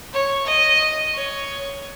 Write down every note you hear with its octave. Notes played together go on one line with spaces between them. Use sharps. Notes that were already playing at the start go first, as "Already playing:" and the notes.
C#5
D#5
C#5